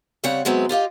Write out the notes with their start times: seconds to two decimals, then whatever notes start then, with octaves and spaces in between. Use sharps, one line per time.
0.24 C#3 G3 C4 C#5 F#5
0.45 C3 F#3 G#3 B3 C4
0.69 F4 G4 D#5 F5